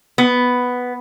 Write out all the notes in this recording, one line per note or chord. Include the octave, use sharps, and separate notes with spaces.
B3